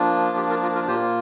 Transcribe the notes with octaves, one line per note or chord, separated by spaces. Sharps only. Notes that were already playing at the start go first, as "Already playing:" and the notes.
Already playing: F3 A#3 D4 F4
G4
F4 A#4
F4 A#4
F4 A#4
A#2 A#3 F4 G4 C5